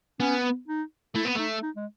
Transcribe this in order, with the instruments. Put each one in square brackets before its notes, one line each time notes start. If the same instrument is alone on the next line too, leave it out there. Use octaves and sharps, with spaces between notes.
[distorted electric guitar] B3 [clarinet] C#4
[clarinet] D#4
[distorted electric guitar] A3 [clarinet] E4
[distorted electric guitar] B3
[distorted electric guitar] A3 [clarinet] D#4
[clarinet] D#4
G#3